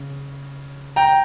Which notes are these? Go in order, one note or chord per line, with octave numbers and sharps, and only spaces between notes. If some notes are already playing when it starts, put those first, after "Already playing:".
Already playing: C#3
G5 A#5